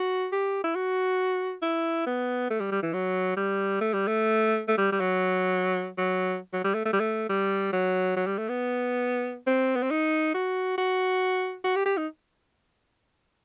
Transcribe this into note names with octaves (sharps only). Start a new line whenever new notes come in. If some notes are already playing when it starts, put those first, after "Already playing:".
Already playing: F#4
G4
E4
F#4
E4
B3
A3
G3
G3
E3
F#3
G3
A3
G3
A3
A3
G3
G3
F#3
F#3
F#3
G3
A3
A3
G3
A3
G3
F#3
F#3
G3
A3
B3
C4
B3
C4
D#4
F#4
F#4
F#4
G4
G4
D#4